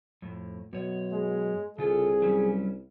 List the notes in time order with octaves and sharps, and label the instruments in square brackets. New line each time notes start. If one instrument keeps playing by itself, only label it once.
[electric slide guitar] F2 A2
[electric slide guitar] F#2 C#5 [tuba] B2
[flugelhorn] G#3
[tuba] C2 [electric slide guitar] C#3 F4 A4 [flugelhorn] G#4
[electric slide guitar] F#3 G3 C#4